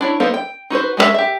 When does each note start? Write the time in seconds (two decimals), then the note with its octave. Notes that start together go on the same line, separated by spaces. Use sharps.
0.01 D4 E4 C#5
0.20 A#3 B3 D#4 A4 C5
0.34 G5
0.70 D#4 F#4 B4 C5
0.97 G#3 A3 F#4 G#4 E5
1.14 G4 E5